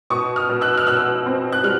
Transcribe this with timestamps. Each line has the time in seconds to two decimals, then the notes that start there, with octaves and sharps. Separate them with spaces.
0.10 B2 C#6 D#6
0.36 D#6 F6
0.49 B2
0.61 E6 F#6
0.77 F6
0.87 B2 E6 F#6
1.26 C4
1.52 F#6
1.63 G3 F6